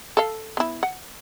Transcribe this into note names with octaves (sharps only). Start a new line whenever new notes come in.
A4 F5
B3 E4
F#5